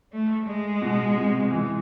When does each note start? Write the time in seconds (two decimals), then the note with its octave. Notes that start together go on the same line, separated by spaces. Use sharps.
0.13 A3
0.47 G#3
0.82 B2
1.16 C3
1.51 E3